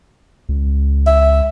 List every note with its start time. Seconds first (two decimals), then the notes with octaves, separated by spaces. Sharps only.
0.49 C#2
1.07 E5